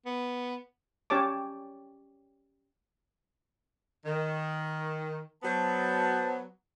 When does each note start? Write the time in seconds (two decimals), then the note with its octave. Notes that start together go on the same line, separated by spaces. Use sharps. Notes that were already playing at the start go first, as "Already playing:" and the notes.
0.06 B3
1.10 C#4 G4 C#5 A5 D6
4.06 D#3
5.43 F#3 B3 C5 A5